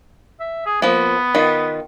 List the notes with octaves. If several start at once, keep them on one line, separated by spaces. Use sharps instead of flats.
E5
G#4
F3 A#3 B3
D#3 F4